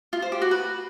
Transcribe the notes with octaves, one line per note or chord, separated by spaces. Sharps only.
F4
C5
G4
F#4
B4